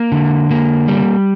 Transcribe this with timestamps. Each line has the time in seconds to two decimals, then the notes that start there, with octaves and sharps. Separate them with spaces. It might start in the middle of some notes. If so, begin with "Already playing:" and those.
Already playing: A#3
0.12 D3
0.51 A#3
0.88 G3